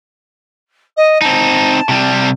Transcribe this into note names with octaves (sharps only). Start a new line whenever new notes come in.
D#5
C4 D#4 A5
C3 G3